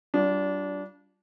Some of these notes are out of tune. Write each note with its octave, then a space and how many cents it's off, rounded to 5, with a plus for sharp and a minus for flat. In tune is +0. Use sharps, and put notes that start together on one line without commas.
G3 -35 D4 -20 F4 +0